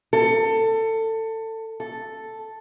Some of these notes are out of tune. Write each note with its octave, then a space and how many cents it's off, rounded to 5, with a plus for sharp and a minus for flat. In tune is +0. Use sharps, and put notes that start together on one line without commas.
A4 +20
A4 +0